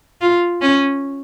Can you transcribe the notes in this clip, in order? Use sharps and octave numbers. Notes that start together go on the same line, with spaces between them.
F4
C#4